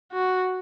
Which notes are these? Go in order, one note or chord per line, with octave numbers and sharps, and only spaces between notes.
F#4